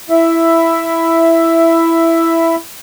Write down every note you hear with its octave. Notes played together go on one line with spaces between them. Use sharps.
E4 E5